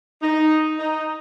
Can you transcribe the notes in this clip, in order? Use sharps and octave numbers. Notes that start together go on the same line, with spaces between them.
D#4
D#4